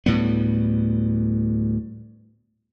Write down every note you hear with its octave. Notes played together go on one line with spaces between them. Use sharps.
D2 A2 G3 B3